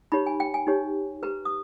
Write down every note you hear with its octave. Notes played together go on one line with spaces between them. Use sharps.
D#4 G4 C#5 B5
G#5
G5
G#5
D#4 G4 C#5
G4 B4 A#5
D#6